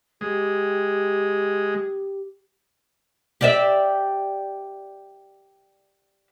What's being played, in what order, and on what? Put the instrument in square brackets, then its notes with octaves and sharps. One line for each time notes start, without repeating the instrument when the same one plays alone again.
[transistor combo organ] G#3 [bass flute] G4
[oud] G4 D5 E5